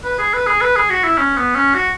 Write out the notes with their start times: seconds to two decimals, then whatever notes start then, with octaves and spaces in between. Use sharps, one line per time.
0.04 B4
0.19 G#4
0.34 B4
0.47 G#4
0.62 B4
0.76 G#4
0.90 F#4
1.04 E4
1.18 C#4
1.37 B3
1.55 C#4
1.75 F#4